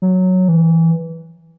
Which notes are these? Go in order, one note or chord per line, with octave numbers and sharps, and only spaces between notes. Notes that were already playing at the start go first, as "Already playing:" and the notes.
F#3
E3